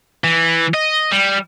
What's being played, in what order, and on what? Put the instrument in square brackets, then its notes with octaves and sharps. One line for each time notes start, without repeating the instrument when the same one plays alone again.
[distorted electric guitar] E3
D#5
G3